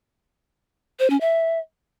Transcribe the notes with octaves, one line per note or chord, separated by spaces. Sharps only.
C5
C#4
E5